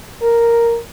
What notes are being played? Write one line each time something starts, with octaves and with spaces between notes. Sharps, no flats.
A#4